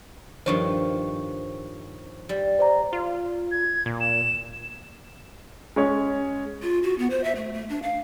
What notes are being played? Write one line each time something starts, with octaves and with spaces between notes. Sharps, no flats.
G2 D#3 F3 C5 C#5 C#6
G3
C5 D5 A#5
F4
G#6
A#2
E7
G#3 C#4 C#5
F4
F#4
B3
C5
E5
A3
A3
D4
F5